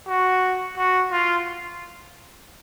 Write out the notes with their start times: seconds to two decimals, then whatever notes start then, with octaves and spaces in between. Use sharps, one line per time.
0.08 F#4
0.78 F#4
1.12 F4